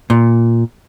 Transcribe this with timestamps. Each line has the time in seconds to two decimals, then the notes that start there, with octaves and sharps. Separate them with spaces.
0.10 A#2